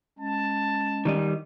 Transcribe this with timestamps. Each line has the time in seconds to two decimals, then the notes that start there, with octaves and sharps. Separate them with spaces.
0.19 G#3 C#4 A5
1.05 D#3 G3 D#5